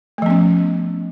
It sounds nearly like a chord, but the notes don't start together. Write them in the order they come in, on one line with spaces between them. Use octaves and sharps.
A3 F3 B3 C#4